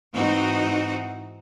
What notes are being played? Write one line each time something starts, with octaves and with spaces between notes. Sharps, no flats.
G#2 E3 C4 D#4 F#4